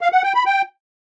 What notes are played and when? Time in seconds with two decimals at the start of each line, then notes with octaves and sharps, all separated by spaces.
0.01 F5
0.12 F#5
0.24 G5
0.35 B5
0.46 G5